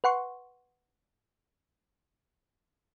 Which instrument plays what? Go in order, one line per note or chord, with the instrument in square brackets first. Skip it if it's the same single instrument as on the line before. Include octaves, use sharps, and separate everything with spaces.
[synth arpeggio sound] B4 F#5 C6 C#6